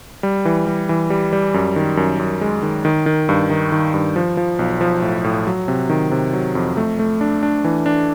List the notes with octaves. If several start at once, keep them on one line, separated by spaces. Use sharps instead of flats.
G3
E3
G3
E3
G3
G3
F#2
D#3
F#2
F#2
G#3
D#3
D#3
D#3
G2
D#3
D#3
G2
F3
F3
B1
F3
A2
A2
F#3
C3
D#3
C3
F#3
F2
A3
A3
D4
D4
E3
D4